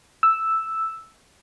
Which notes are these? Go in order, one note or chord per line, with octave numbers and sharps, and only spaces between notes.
E6